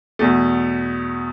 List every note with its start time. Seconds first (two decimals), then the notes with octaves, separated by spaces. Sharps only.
0.19 E2 B2 A3